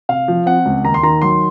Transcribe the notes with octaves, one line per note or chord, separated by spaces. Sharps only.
C3 F5
F3
C4 F#5
C#2
D#2 A#5
C6
D#3 A#5
F#3 C6